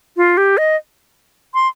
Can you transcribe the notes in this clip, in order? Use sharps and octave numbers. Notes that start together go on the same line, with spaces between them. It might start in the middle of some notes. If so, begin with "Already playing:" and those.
F4
G4
D#5
C6